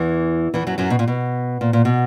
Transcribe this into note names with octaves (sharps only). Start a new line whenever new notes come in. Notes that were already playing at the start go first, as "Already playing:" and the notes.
Already playing: E2 E3
E2 E3
F#2 F#3
F#2 F#3
B2
A#2
B2
A#2
A#2
B2